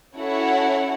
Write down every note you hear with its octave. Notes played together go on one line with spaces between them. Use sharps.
C#4 E4 F#4 A4 C#5 F#5